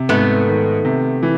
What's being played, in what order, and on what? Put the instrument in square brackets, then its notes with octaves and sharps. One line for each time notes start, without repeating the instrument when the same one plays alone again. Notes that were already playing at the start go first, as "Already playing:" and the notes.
Already playing: [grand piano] C3
[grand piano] G#2 [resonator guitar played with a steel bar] A3 B3
[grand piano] D#3
C3
E3